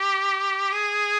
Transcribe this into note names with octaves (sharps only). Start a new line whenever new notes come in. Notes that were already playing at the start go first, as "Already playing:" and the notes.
Already playing: G4
G#4